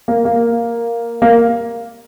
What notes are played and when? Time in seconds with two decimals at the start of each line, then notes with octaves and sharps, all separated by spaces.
0.08 A#3
0.25 A#3
1.22 A#3